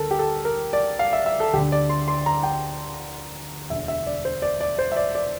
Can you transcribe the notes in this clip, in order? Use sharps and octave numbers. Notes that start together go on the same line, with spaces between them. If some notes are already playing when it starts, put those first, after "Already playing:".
Already playing: D2 D3 A4 A#4
G4
A4
A#4
D5
F5
E5
E5
A4
D2 D3 G4
D5
C6
C6
A#5
G5
E1 D2 D3 E5
E5
D5
C5
D5
D5
C5
E5
D5
D5